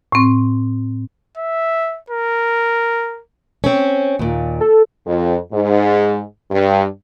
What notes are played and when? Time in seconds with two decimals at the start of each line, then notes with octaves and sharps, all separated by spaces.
0.12 A2 C4
1.37 E5
2.10 A#4
3.64 C4 C#4
4.19 D#2 A#2
4.60 A4
5.07 F2
5.53 G#2
6.50 G2